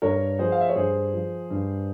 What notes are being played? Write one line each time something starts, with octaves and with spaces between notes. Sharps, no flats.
G2 A#4 C#5
F3 G#4 C5
F5
E5
C#5
G2 G#4 C5
F3
G2